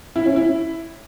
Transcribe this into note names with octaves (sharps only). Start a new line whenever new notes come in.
E4
C#4
E4